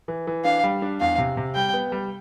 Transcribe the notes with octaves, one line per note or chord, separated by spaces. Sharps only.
E3
E3
D4 F5
G3
D4
E2 F5
C3
C3
G3 G5
B3
G3